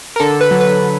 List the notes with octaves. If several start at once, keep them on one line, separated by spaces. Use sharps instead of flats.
A#4
D3 A4
B4
F#3
B4